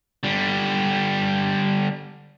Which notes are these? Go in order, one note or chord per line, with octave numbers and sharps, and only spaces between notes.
D3 G3